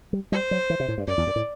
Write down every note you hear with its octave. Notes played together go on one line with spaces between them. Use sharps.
G3
G3 C5
F#3
E3
C3
A2
G2
F#2 D5
E2
F#2
A2